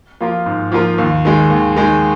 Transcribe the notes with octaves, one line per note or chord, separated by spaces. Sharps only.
F3 A#3 F4 A#4
G#2
F3 A#3 F4 A#4
D#2
D#3 G#3
D#2
D#3 G#3